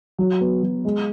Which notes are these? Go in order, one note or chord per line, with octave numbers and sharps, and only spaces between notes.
F#3
B3
F#3
G#3